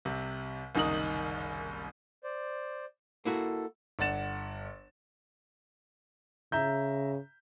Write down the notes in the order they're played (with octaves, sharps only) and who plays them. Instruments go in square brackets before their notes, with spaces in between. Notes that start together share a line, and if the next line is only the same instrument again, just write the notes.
[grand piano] C2 C3
F#1 C2 D#3 D#4 D#6 F#7
[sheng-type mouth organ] C5 D5
[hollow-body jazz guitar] A#3 E4 F#4 [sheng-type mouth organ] A4
[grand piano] G1 D5 F#5 A6 E7
[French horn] C#3 [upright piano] E5 A#5 G6